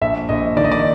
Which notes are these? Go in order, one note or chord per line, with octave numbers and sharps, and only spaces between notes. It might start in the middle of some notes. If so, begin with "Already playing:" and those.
A#1 E5
A#1 D#5
D#3 D5
D#5
D5